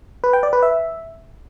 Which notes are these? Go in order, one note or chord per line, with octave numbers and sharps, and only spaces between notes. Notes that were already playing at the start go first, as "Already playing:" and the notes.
B4
G5
D5
B4
E5